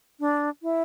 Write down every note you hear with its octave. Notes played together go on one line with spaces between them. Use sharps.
D4
E4